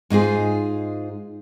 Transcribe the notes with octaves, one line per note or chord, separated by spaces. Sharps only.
G#2 D#4 F4 G#4